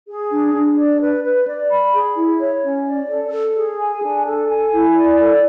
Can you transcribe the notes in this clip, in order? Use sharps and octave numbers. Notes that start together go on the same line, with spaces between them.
G#4
D4
D4
D5
B4
B4
D5
B5
G#4
E4
C#5
C#4
D5
A4
A4
G#4
G#5
D4
A4
G#5
E4
D5
A4